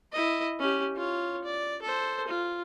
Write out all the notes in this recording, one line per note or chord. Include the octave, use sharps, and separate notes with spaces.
E4 D#5
C#4 G4
F4 C#5
D5
A4 C5
F4